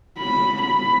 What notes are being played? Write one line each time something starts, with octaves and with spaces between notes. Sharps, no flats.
B5
B5